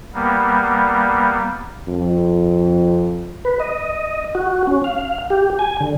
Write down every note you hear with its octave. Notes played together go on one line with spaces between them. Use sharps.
G3 A#3 B3
F2
B4
D#5
F#4
C#4
F5
G4
G#5
D3